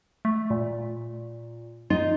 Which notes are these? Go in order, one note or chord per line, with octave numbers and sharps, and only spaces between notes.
A3
A#2
D#4 F4